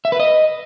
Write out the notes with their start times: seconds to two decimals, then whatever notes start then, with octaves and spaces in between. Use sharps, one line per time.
0.05 E5
0.12 B4
0.20 D#5